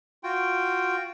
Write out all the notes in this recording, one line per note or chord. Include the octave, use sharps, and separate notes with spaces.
F4 F#4 G5